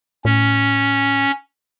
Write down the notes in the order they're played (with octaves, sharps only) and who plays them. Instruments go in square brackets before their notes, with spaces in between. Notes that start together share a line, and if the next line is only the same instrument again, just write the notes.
[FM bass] A2 [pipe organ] C#4